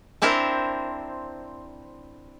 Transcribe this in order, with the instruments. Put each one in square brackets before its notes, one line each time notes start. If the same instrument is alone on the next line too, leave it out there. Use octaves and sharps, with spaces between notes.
[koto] C4 D4 E4 A#4 C5